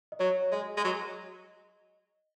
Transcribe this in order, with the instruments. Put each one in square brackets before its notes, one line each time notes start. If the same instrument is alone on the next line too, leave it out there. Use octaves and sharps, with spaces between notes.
[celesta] D#5
[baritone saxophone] F#3 [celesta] C#5
[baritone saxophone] G#3 [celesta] D#5
[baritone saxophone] G#3
F#3